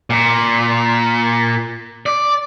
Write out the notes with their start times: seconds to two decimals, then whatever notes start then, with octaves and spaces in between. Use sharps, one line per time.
0.10 A#2
2.06 D5